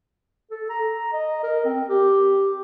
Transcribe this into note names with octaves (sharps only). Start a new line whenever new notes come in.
A4
A#5
D#5
A#4
C4
G4